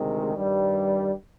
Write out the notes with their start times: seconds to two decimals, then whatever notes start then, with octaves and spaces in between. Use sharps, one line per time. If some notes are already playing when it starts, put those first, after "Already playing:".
Already playing: D2 C3 D#3 G#3
0.36 G2 D#3 G3